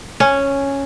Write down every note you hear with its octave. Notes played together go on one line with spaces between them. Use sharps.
C#4